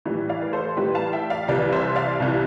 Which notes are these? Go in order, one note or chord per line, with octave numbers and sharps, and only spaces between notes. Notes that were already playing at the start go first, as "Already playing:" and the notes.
A2 E3 G3
D5 F5
B4
A4 C5
A2 E3 G3 G4 B4
F5 A5
E5 G5
D5 F5
C2 C3 E3 G3 B4 D5
C5 E5
D5 F5
C2 C3 E3 G3